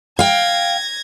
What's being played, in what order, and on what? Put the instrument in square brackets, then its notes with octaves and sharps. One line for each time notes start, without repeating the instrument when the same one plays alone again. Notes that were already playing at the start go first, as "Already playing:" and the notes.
[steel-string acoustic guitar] F5 G5 [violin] G#6 A#6